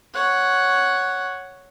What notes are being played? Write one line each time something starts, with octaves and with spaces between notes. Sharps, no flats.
C#5 F#5